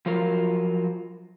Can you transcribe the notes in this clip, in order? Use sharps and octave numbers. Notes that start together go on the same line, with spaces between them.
F3 F#3 F4 A#4